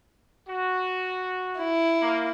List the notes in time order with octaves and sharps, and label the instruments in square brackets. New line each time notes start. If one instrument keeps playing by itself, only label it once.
[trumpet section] F#4
[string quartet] E4
[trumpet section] A#3